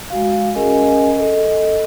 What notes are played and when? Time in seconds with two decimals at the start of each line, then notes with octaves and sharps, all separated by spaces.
0.10 G#3 F#4 F5
0.55 C#4 G#4 A#4 D#5 G#5
1.18 A4 D#5